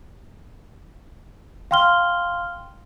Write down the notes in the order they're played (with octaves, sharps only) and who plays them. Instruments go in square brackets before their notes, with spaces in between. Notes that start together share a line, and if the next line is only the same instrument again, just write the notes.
[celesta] F5 G5 C6 F6 G7